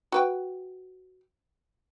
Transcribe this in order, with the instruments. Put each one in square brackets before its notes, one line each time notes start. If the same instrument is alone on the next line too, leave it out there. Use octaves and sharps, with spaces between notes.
[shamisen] F#4 B4 G5